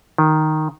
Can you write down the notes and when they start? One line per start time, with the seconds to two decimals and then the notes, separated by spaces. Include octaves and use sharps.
0.18 D#3